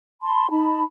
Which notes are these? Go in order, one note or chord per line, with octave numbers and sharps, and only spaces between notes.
A5 B5 C6
D#4 A5 B5